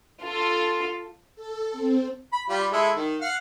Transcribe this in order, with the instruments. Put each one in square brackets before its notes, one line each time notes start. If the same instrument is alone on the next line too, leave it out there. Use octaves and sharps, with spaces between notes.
[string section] F4 A4
[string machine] A4
C4
[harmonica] B5
G3 F4 B5
G#3 E4 A4
D#3
F5 F#5